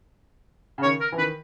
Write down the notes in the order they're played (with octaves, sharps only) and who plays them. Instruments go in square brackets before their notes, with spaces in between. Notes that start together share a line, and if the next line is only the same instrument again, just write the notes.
[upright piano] C#3
[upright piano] D#3 [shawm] C#5
[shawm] A#4
[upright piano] E3
[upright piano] D#3 [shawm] B4